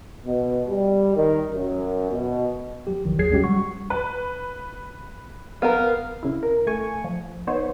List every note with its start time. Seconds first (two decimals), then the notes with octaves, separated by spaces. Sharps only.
0.25 B2
0.68 G3
1.14 D#3
1.52 F#2
2.11 B2
2.87 F#3 G4
3.05 A1 D#3 E3 F#3
3.18 G#1 D#2 F#3 G#4 G#6 C7
3.31 F#3 G#3 C#4 F#4 G4
3.44 G3 F#5 C#6
3.90 B4
5.62 B3 A#4 F5
6.23 C#3 E4
6.43 A#4
6.67 A3 G#5 C#6
7.04 F3
7.47 B3 D#4 C5 C#5